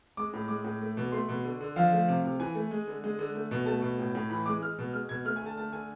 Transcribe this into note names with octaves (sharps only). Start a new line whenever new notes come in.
G#3 D6
A2
G#3 D6
A2
A3
B2
A3 C6
B2
D3
D3
F3 F5
A3
C3
C3
E3 G#5
A3
G#3
D3
G#3
D3
A3
B2
A3 A5
B2
A2
A2
E3 B5
G#3 D6
G#3 F6
B2
G#3 F6
B2 G#6
A3 F6
G#5
D3 A5
A3 A5
D3 G#5